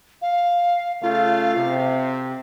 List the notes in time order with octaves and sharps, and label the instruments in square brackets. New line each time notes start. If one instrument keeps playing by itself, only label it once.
[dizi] F5
[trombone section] C#3 A3 F4 [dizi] F5
[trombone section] C3